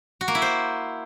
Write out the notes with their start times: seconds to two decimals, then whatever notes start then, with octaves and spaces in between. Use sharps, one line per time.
0.21 F#4
0.28 A#3
0.35 E4
0.42 C5